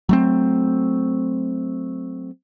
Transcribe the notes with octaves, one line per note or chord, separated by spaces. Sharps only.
F#3 A3 C4